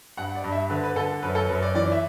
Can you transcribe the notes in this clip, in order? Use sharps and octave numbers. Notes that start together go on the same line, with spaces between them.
G2 F#5
D5
G2
E5
D3 B4
B4
D3 A4
F#2 B4
A4
F#2 B4
D5
E3 D5
E5